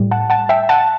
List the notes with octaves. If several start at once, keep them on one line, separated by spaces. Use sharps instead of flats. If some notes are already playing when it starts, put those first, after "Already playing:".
Already playing: A2 G3
F#5 A5
F#5 A5
E5 G5
F#5 A5